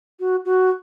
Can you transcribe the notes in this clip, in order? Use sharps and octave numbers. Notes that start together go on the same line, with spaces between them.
F#4
F#4